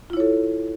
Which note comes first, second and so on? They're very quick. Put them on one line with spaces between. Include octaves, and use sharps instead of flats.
F4 E4 C#5 A4